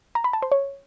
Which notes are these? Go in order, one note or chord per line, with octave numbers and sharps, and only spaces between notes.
A#5
B5
A5
C5
C#5